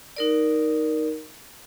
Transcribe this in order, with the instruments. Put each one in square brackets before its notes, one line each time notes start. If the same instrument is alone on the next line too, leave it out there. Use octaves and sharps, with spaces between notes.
[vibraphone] D#4 A#4 D5